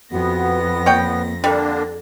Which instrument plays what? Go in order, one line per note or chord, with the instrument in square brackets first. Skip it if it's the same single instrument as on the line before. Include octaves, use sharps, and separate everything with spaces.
[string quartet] F2 A#6 [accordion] B3 [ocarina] F#4
[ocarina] A#3 [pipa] C#5 G5
[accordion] D3 A#3 D4 [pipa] G3 [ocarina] A4